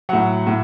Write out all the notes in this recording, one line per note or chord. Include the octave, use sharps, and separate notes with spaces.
A2 F#3 F#5
A2